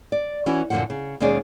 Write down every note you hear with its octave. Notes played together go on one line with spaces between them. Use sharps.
D5
E3 C#4 E4 F#4
F#2 A#2 D3 E3 F3 F#5
C#3
D#2 B2 G#3 C#4 G#4 D5